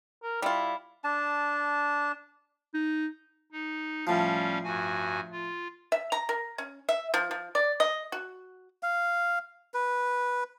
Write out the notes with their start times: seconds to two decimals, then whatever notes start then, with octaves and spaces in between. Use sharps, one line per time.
0.23 A#4
0.42 G3 E4 F4
1.04 D4 A5
2.74 D#4
3.52 D#4
4.07 A2 F3 G3 C#4 F5
4.64 G2 F#4 G#5
5.32 F4
5.92 E5
6.12 A#5
6.29 A#4
6.58 C#4
6.89 E5
7.14 F3
7.31 F3
7.55 D5
7.80 D#5
8.12 F#4
8.83 F5
9.74 B4